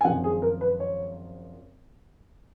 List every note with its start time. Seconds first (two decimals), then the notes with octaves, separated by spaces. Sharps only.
0.01 G#5
0.04 G#1 F#2 F3 F#5
0.24 G#4
0.42 A#4
0.61 B4
0.80 C#5